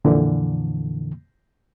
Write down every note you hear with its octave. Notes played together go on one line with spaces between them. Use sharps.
F2 A#2 D3 E3